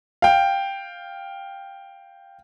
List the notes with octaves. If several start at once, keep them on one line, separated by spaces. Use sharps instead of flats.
F5 G5